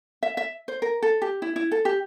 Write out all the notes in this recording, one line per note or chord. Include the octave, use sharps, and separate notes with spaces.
E5
E5
C5
A#4
A4
G4
E4
E4
A4
G4